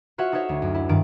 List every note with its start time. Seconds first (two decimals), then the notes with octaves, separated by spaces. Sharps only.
0.18 F4 F#4 C#5 E5 F#5
0.32 D#4 A4 C5 C#5 E5
0.49 D2
0.62 F#2
0.74 E4
0.89 G2 D#3 D5 D7